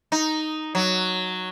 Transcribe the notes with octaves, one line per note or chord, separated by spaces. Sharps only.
D#4
F#3